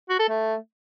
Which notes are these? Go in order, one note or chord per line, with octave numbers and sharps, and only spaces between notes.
F#4
A4
A3